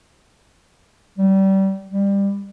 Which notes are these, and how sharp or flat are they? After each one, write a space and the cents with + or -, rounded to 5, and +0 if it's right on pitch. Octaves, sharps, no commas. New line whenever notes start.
G3 -25
G3 +20